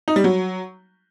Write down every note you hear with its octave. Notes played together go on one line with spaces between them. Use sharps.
D#4
G3
F#3